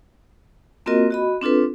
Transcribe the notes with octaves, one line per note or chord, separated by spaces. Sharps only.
A#3 C4 F4 F#4 A#4 D#5
F#4 D#5 B5
C4 D4 F4 A4 B4